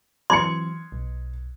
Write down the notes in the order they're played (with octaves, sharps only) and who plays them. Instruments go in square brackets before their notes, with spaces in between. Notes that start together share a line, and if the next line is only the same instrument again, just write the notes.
[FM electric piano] E3 F#3 C4 [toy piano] C6 [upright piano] G#6 C#7
[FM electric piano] B1